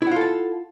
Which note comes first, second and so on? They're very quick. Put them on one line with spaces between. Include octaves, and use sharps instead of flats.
E4 F#5 F4 A4 A5